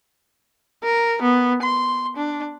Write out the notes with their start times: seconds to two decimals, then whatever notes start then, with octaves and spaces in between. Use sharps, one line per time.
0.84 A#4
1.22 B3
1.62 C6
2.17 D4